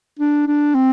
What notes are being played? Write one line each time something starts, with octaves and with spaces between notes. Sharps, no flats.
D4
D4
C4